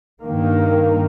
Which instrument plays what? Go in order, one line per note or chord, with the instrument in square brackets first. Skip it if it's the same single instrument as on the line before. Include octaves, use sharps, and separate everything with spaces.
[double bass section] G2 D#3 A#3